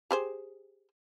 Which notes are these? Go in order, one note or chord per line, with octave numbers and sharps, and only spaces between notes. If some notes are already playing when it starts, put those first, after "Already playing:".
G4 G#4 C5